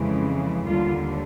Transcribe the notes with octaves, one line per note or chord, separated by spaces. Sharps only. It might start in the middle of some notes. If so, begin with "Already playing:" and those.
Already playing: F2 C#3 E3 G#3
D#2 D3 G3 F4